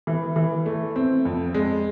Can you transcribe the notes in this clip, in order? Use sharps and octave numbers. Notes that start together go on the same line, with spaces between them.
E3
E3
A3
C4
F2
G#3